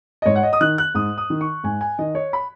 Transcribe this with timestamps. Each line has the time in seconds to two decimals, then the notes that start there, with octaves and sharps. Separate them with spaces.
0.22 D#5
0.26 G#2 C#5
0.36 F#5
0.43 D#5
0.53 D#6
0.61 D#3 F#6
0.78 F#6
0.95 G#2 D#6
1.18 D#6
1.30 D#3
1.41 C#6
1.64 G#2 G#5
1.81 G#5
1.98 D#3 D#5
2.15 C#5
2.33 B5